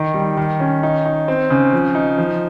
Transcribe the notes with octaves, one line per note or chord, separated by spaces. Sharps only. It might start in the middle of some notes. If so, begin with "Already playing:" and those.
Already playing: D#3 D#4
G3
D#3
C#4
D#4
D#4
C4
C#3
F3
D#4
F3